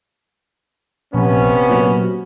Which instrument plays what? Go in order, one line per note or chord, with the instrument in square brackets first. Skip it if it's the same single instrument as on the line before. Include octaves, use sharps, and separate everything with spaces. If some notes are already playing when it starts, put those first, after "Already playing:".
[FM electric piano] A#1 [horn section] C3 B3 C#4
[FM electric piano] A#2 F#3